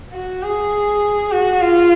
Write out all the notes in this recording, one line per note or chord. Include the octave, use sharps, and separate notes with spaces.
F#4
G#4
F#4
F4